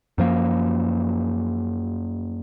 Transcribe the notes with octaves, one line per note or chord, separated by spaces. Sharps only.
F#2 F3 A#3